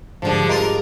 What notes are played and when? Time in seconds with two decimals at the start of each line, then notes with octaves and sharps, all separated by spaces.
0.22 G#2 D3 F3 G3
0.49 F4 A#4 D#5